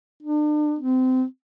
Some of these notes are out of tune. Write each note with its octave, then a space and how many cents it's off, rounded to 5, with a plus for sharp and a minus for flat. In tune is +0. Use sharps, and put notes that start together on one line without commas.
D4 +35
C4 -25